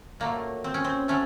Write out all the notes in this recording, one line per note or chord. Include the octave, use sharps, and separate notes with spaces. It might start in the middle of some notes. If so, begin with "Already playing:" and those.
A#2 F#3 A3 A#3
C4
C#4
C4
F#3 A3 C#4